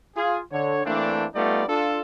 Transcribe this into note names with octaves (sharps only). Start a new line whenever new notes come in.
F4 G#4
D3 C#5
E3 A3 A#3 C4 D4
G3 A3 B3 D#4 F4 D5
D4 F4 A4